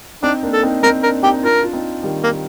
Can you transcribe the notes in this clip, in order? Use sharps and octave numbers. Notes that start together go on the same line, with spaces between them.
C4 D4 D#4
A#3 D4
A4
C4 D#4
C4 D#4 A#4
A#3 D4 A#4
C4 D#4 G4
D#4
D4 F4 A#4
F4
C4 D#4
D#3 G3
A#3